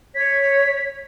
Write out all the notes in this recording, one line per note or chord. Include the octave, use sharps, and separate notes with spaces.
C#5 G#6 B6